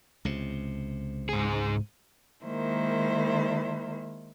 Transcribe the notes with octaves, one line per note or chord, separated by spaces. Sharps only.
C#2 C3
G#2 G#4
D#3 G#3 A#3 E4 C5